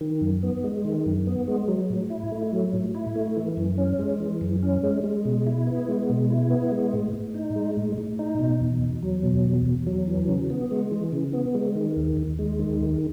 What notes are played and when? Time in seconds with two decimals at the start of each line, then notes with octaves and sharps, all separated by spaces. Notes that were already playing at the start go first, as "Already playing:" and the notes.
0.01 D#3
0.21 F#2
0.43 B3
0.64 G#3
0.85 D#3
1.06 F#2
1.27 B3
1.48 G#3
1.68 F#3
1.90 A2
2.10 E4
2.32 A3
2.52 F#3
2.73 A2
2.95 E4
3.16 A3
3.37 E3
3.57 F#2
3.78 C#4
3.99 G#3
4.20 E3
4.41 F#2
4.63 C#4
4.83 G#3
5.04 G#3
5.25 B2
5.46 E4
5.67 B3
5.88 G#3
6.10 B2
6.30 E4
6.50 B3
6.72 G#3
6.93 A2
7.13 A2
7.34 D#4
7.56 G#3
7.77 A2
7.98 A2
8.19 D#4
8.39 B2
8.60 E2
8.82 E2
9.03 F#3
9.23 B2
9.44 E2
9.65 E2
9.87 F#3
10.08 E3
10.28 C#3
10.50 B3
10.71 G#3
10.91 E3
11.12 C#3
11.33 B3
11.54 G#3
11.75 D#3
11.97 D#2
12.17 D#2
12.39 G#3
12.59 D#3
12.81 D#2